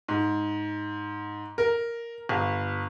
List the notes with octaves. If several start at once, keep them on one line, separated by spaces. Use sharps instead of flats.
G#2
A#4
G1